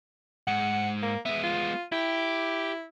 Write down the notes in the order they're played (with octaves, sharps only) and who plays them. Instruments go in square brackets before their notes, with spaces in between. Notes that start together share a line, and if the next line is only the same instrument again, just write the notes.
[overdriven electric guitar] G#2 [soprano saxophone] F#5
[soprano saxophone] A#3
[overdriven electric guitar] G#3 B3 [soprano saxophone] E5
[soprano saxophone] F4
[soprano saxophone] E4 [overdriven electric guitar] G4